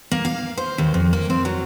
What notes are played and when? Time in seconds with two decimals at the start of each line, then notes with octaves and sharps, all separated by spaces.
0.12 A#3
0.25 F5
0.57 C5
0.78 D#2
0.94 F2
1.13 A#3
1.30 C4
1.45 F#3